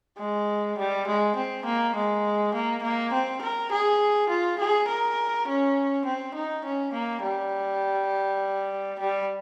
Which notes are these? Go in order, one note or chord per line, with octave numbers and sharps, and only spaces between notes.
G#3
G3
G#3
C4
A#3
G#3
A#3
A#3
C4
A#4
G#4
F4
G#4
A#4
C#4
C4
D#4
C#4
A#3
G3
G3